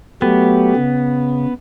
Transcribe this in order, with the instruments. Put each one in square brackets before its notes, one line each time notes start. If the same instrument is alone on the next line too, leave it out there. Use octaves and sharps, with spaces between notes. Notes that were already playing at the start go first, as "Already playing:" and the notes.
[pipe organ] F#3 A3 G4 [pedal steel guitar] B3
[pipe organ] C#3